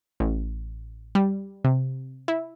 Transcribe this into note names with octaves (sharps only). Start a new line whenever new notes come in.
A1
G3
C3
E4